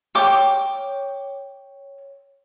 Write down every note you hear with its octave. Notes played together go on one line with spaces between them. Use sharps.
C#5 G5 D6